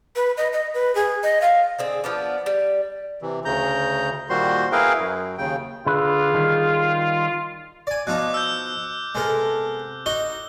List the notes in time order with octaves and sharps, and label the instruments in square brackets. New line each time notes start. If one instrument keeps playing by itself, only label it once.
[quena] B4
D#5
D#5
B4
G#4
D#5
F5
[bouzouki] D3 C4 G#4
F3 B3 D4
G3
[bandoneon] C3 E3
D2 C#3 A#5 G6
A#2 D#3 G3 F#4 C5 C6
E4 G#4 A#4 B4 F5 G5
F#2
D#2 C#3 G5
[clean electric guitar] D3 B4 [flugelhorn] F4 [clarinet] G#4
[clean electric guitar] D#3 G3
[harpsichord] D5 G#5
[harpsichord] B2 F3 D#4 [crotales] D6 F#6
[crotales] E6 G6
[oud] C3 A4 [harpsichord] G#3 B3 A#4
[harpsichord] D#4 F#4 [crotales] G7